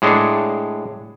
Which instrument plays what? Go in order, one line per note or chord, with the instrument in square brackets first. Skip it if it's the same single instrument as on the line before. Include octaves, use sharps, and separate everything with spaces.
[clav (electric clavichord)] A2 G#3 D4 G#4 C#5